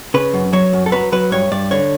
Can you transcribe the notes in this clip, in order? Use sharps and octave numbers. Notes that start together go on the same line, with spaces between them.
C#3 B4
F#2
F#3 C#5
F#2
A4
F#3 B4
F#3 B4
G2 C#5
G2 D5
D3 C#5